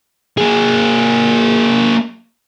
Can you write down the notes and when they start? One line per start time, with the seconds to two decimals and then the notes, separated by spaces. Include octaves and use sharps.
0.37 A#3 G#4